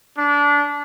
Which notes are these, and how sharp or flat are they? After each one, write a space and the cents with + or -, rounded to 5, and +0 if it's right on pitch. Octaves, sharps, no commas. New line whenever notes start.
D4 -20